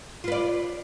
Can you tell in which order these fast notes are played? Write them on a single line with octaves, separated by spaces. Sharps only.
F4 B4 D5